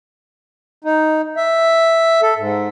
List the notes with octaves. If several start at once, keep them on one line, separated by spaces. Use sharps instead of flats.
D#4
E5
A4
G#2